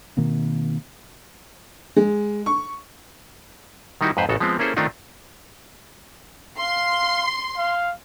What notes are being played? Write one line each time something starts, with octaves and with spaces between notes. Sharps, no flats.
B2 D#3 A#3 C4
G#3
C#6
D#3 G3 D#4 E4 F#4
F2 G#2 B4 C5
A1 C#3 F#4 A4
F3 G#3 B3 C4
A#3 C#4 E4 G#4 A4 C5
D#3 A3 C4 D4 D#4 F4
F5 C6
F5